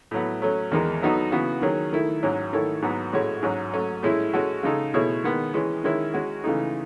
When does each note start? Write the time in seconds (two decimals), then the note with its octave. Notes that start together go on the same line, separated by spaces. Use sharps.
0.11 A2 F#3 B3
0.42 F#3 A3 C#4
0.71 E2 D#3 G#3 D#4
1.02 F#3 B3 D#4 F#4 A4
1.32 C#3 E3 B3 F#4
1.62 D#3 F#3 C#4 G#4
1.92 D#3 A3 E4
2.23 G#2 F#3 C#4
2.53 D#3 A3 E4 A4 C#5
2.82 G#2 F#3 B3 F#4
3.13 A2 G#3 C#4 F#4 C#5
3.43 G#2 F#3 C#4
3.74 F#3 A3 C#4
4.03 A2 G#3 C#4 E4
4.33 G#3 C#4 F#4 A4
4.63 C#3 G#3 D#4 A4
4.94 B2 A3 E4 G#4 C#5
5.24 D#3 G#3 B3
5.54 E3 G#3 C#4
5.84 D#3 G#3 C#4 E4
6.14 G#3 C#4 F#4
6.44 C#3 E3 A3 D#4